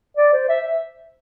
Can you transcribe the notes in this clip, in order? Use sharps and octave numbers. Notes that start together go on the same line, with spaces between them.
D5
C5
E5